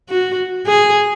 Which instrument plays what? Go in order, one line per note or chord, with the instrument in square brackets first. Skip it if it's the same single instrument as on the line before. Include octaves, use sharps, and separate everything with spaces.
[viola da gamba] F#4
G#4